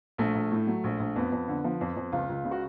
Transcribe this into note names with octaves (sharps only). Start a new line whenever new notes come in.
A#1 A3
A#1
A2
F#3
A#1
A#1
F2 B3
F2
D3
F3
F2
F2
C#2 F4
C#2
C#3
F#4